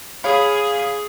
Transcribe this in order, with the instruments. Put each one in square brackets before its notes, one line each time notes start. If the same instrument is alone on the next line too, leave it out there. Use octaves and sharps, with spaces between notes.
[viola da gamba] G#4 [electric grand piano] C#5 F5 B5